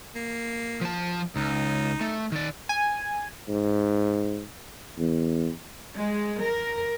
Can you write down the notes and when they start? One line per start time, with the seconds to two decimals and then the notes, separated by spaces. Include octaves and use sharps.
0.15 A#3
0.81 F3 A5
1.36 C#2 D#4
2.01 A3
2.32 D#3 D5
2.69 G#5
3.48 G#2
4.98 E2
5.95 G#3
6.39 A#4